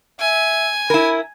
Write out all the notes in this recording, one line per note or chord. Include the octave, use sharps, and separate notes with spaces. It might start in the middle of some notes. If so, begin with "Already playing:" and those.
E5 G#5
E4 A#4 B5